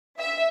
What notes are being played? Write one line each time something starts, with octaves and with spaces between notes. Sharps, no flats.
E5